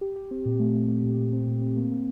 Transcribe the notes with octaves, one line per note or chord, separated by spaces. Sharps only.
G4
G4
C4
A#2
A3
A3
A3
A#2
A#2
C4
A#2
C4
A#3
A#3